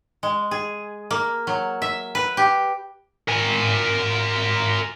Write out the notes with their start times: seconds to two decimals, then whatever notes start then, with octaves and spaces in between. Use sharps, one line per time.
0.23 G#3
0.51 G#4
1.11 A#3
1.47 F#3
1.82 E5
2.15 B4
2.37 G4
3.29 A#4 G#5